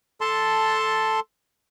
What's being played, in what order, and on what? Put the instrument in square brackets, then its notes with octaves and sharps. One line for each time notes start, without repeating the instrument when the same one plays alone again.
[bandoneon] A4 A5 C6